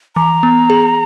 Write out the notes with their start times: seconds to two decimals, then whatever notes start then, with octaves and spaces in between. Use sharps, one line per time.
0.16 E3 A#5
0.43 B3
0.70 G#4